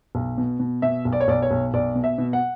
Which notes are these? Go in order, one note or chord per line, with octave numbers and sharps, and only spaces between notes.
B1
B2
B2
B2 E5
B1
D5
C#5
B1 D5
C#5
B1
B1 D5
B2
E5
B2
F#5